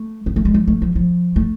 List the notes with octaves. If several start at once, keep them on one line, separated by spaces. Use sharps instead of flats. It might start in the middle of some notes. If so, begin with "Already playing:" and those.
Already playing: A3
B3
A3
G#3
F3
A3
F3
F3
A3